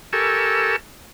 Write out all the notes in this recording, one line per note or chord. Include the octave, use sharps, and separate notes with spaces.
G4 A4 A#4 G#5 C#6 E6